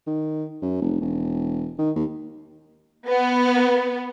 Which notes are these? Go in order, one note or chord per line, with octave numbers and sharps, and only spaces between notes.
D#3
F#2
F1
E1
D#3
D#2
B3